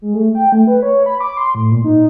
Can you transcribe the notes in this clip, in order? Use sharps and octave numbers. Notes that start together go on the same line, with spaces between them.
G#3
A3
G5
A3
B4
C#5
B5
D6
C6
A2
A#2
D#4